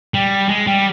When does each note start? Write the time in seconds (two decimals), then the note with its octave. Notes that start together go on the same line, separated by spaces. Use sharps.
0.14 G3
0.49 G#3
0.67 G3